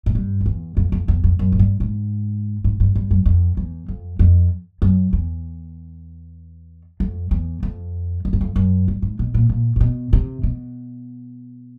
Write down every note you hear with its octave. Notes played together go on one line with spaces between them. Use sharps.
G#2
G2
F2
E2
F2
F2
E2
F2
F#2
G#2
G2
G#2
G#2
G2
G2
F#2
F2
E2
F2
F2
F#2
E2
F2
E2
F2
F2
F#2
F2
F#2
G2
G#2
B2
A#2
A#2
A#2
B2
C3
B2